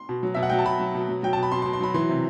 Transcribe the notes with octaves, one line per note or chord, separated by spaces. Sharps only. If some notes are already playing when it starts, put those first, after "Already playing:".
Already playing: C6
B2
F#3
B2 E5
F#5
F#3 G5
A5
B2 B5
F#3
B2
F#3
F#3 G5
B2 A5
B5
B2 C6
C6
B2
C6
F#3 B5
E3 C6
C3